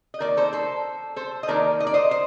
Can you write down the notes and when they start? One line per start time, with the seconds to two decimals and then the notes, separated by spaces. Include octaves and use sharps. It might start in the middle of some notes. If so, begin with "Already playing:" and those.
0.14 D#5
0.20 D#3 A#3 D#4 A#4 D5
0.37 A4 C5
0.53 A4 C5
1.16 A4 C5
1.43 D#5
1.48 D#3 A#3 D#4 A#4 D5
1.80 D#5
1.87 D5
1.94 C5 D#5
2.11 C5